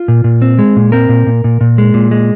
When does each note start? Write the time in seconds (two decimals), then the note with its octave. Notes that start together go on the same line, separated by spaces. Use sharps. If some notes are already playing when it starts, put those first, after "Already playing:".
Already playing: F4
0.08 A#2
0.24 A#2
0.42 C4
0.59 G#3
0.76 A#2
0.92 C4 A#4
1.09 A#2
1.27 A#2
1.44 A#2
1.61 A#2
1.78 G#3
1.94 A#2
2.11 G#3